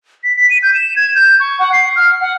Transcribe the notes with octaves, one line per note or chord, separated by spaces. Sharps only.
B6
B6
D#7
G6
E7
G#6
G6
C#6
F#5
C7
F6
F#5